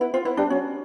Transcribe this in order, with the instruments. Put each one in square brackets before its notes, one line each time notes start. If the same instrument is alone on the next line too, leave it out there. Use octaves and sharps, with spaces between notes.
[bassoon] B3 [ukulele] E4
[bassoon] C4 [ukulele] F4
[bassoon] B3 [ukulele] E4
[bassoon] G3 [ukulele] D4
[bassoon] F#3 [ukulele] C#4